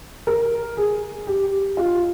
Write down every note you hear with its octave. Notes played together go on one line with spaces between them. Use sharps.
A#4
G#4
G4
F4